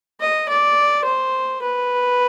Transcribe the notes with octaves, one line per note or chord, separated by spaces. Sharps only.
D#5
D5
C5
B4